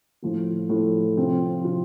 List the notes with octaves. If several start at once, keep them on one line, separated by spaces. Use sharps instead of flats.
A2 F3 A3
A2 F3 A3
C3 F3 C4 F4
C3 F3 C4 F4